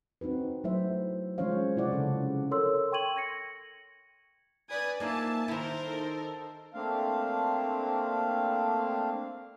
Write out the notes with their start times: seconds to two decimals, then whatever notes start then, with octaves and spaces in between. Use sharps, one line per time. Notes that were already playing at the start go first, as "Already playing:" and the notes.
0.21 C4 D#4 F#4 B4
0.64 F#3 A3 E4 C5 E5
1.38 F3 G#3 C#4 C5 C#5 F5
1.77 C3 E4 F4 D5 F#5
1.92 C#3 A4
2.51 A4 A#4 C#5 C6 E6
2.92 G5 C6 C#6 G#6 D#7 F#7
3.16 G#6 A#6 C#7
4.70 B4 D5 G#5 D#6 G#6
5.00 A#3 D#4 F4 E5 G#5 A5
5.48 D#3 E4 A#4 C5 E5
5.84 D#4 A4
6.74 A3 A#3 C4 D4 F5